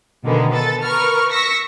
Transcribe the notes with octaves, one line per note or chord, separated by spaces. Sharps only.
B2 D3 D#3 G#3 A#3 B3
A4 B4 A6
A#4 B4 A#5 C#6 F6
C#6 E6 A#6 B6 C#7